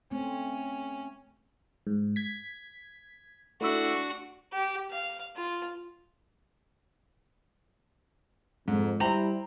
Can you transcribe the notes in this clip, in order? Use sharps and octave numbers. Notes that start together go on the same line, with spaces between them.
A3 C4 C#4
G#2
G#6 B6
A3 D4 E4 F#4 E5
G4
F5
F4
F2 G#2
G3 E4 C5 G5 A#5 F#7